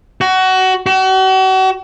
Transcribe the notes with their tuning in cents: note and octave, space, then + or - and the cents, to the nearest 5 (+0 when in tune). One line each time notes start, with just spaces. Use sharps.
F#4 +20
F#4 +40